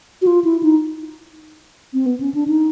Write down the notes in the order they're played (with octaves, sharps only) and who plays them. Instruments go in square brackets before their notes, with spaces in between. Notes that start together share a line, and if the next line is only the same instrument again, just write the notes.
[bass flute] F#4
F4
E4
D#4
C4
B3
C#4
D4
D#4